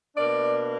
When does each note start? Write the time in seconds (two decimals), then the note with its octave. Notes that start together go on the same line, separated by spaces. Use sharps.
0.15 B2 A#3 D4 D5